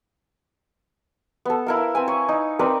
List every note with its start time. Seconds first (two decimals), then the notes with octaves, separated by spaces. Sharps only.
1.45 B3 A4
1.67 E4 A#4 F5
1.95 C4 B4 G#5
2.08 C#5
2.29 D#4
2.59 C4 A#4 B4 D5